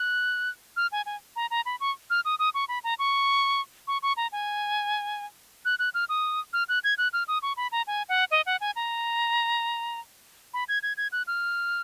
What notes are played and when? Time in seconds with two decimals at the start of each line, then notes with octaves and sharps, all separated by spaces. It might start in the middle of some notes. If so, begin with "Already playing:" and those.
Already playing: F#6
0.77 F6
0.92 G#5
1.06 G#5
1.36 A#5
1.51 A#5
1.66 B5
1.80 C#6
2.10 F6
2.25 D#6
2.39 D#6
2.54 C#6
2.68 B5
2.84 A#5
2.99 C#6
3.87 C#6
4.03 C#6
4.17 A#5
4.32 G#5
5.65 F#6
5.79 F#6
5.94 F6
6.09 D#6
6.53 F6
6.69 F#6
6.84 G#6
6.98 F#6
7.13 F6
7.28 D#6
7.42 C#6
7.57 B5
7.72 A#5
7.87 G#5
8.09 F#5
8.31 D#5
8.46 F#5
8.61 G#5
8.76 A#5
10.54 B5
10.69 G#6
10.83 G#6
10.97 G#6
11.12 F#6
11.27 F6